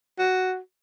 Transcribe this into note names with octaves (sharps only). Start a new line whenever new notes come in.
F#4